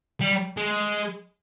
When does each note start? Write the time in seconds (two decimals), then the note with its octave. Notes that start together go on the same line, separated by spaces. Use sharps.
0.21 G3
0.57 G#3